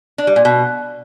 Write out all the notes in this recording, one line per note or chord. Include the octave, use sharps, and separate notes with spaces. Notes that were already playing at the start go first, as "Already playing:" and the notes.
D4
G3
A#2
B2